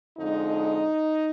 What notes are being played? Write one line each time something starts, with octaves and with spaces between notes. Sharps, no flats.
F2 D3 G#3 D#4